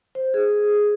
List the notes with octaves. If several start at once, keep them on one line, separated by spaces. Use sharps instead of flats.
C5
G#4